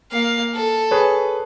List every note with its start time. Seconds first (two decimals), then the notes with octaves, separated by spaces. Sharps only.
0.12 A#3 F5
0.54 A4
0.91 G#4 B4 C#5